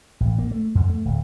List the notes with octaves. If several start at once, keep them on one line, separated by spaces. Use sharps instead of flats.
A1
A#3
A3
F2
A3
D1